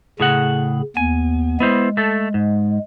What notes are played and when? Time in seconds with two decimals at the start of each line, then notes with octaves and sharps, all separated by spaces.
0.20 A2 C#3 G#4 F#5
0.97 D#2 B3 G#5
1.60 G#3 B3 E4 C5
1.97 A3 A4
2.34 G#2